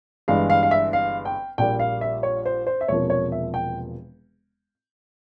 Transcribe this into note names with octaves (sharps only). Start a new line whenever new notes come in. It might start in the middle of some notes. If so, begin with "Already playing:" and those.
G1 G2 E3 G#3 F5
F5
F5
E5
F5
G5
A#1 A#2 G3 A#3 G5
F5
E5
C#5
C5
C5
E5
E1 E2 C3 F3 A#3 C#5
C#5
E5
G5